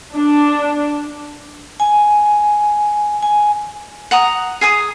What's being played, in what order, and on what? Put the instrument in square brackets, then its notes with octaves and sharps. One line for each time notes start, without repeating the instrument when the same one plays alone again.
[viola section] D4
[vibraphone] G#5
G#5
[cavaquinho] F#5 A#5 D#6
G#4 G#5 D#6